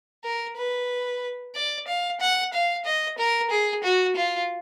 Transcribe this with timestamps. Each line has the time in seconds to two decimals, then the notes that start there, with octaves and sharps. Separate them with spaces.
0.24 A#4
0.57 B4
1.55 D5
1.88 F5
2.20 F#5
2.53 F5
2.85 D#5
3.18 A#4
3.50 G#4
3.84 F#4
4.16 F4